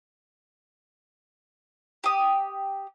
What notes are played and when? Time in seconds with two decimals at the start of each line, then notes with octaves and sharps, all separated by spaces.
2.04 G4 D#6